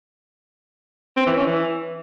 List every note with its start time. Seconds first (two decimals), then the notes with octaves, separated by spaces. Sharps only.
1.17 C4
1.27 E3
1.37 C#4
1.47 E3